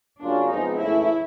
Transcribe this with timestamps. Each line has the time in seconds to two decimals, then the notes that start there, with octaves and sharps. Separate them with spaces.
0.22 C#3 F#3 A#3 C#4 D4 F4
0.50 C3 F3 G#3 B3 D#4
0.78 C#3 E3 A3 E4